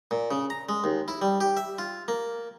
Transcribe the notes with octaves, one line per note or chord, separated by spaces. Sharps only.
A#2
C#3
A#5
G#3
D#2
E4
G3
G4
E5
F4
A#3